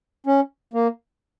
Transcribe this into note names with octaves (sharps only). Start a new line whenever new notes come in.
C#4
A#3